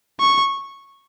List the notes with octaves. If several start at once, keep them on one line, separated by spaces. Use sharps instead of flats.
C#6